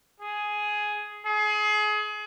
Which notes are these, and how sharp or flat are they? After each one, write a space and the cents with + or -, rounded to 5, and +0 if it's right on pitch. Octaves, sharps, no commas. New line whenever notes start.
G#4 +5
G#4 +30